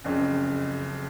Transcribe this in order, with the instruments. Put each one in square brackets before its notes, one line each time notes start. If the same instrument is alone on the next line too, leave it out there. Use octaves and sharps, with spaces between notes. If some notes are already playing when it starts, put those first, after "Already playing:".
[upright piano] F#1 F2 C#3